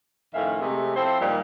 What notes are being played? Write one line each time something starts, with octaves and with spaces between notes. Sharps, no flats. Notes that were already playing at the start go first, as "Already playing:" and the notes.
F2 A2 D#3 C#4 E5 F5
C3 G#3 A3
F3 C4 E4 A4 C5
G2 A#2 D#3 F3 G3